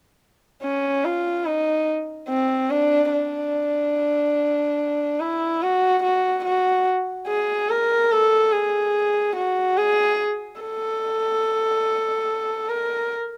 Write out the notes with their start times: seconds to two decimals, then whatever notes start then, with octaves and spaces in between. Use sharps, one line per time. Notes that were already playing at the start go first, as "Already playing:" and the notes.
0.64 C#4
1.05 F4
1.46 D#4
2.29 C4
2.70 D4
3.12 D4
5.20 E4
5.62 F#4
6.03 F#4
6.45 F#4
7.28 G#4
7.70 A#4
8.12 A4
8.53 G#4
9.36 F#4
9.77 G#4
10.60 A4
12.69 A#4